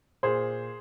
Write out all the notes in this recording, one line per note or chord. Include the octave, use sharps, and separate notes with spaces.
A#2 G#4 C5